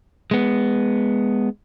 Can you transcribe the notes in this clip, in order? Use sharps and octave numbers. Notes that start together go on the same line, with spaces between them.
G#3 B3